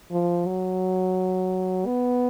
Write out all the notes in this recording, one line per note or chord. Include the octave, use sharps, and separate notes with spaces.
F3
F#3
B3